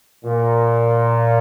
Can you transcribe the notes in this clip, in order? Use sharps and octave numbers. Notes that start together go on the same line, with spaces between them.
A#2